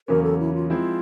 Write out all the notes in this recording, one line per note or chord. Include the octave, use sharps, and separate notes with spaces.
E2 C#3 F#3 A#3 C#4 A#4
A4
E4
F4
F3 G#3 C4 E4 F4